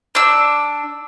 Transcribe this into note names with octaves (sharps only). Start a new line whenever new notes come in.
D4 E6